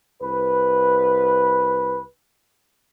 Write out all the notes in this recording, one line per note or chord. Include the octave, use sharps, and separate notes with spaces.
C2 B4